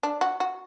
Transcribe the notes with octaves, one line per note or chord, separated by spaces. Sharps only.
D4
F#4
F#4